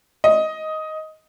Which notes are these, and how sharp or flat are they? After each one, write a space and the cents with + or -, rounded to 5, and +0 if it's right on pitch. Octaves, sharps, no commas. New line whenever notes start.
D#5 +10